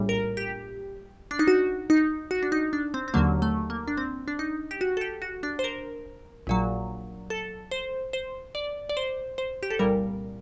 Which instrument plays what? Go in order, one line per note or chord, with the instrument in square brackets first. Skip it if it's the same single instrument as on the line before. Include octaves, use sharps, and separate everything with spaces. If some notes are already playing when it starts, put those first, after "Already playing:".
Already playing: [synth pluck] A#1 A2 G3
A#4
G4
D4
D#4
F#4
D#4
F#4
D4
D#4
D4
C4
C4
D#2 D3 F#3 A#3
A3
A#3
D4
C4
D4
D#4
G4
F#4
A4
G4
F#4
D4
C5
A#4
A#1 A#2 F#3
A4
C5
C5
D5
D5
C5
C5
G4
A4
C2 A#2 G3 A#4